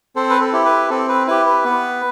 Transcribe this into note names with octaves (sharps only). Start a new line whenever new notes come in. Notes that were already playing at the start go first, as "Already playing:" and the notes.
C4 A4 C5
B4
A4
E4 G4
B4
C4 A4
B4
E4 G4 B4
B4
B3